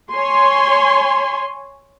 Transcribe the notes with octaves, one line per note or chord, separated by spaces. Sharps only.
C#5 G#5 C6